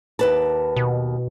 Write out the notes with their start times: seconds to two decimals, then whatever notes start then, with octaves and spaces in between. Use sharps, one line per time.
0.19 D#2 B4 A5
0.76 B2